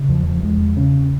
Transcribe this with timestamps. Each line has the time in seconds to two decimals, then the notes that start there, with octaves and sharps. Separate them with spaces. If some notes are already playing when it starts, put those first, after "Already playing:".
Already playing: C#3
0.09 E2 F3
0.27 F3
0.43 E2 G#3
0.77 C#3 C#4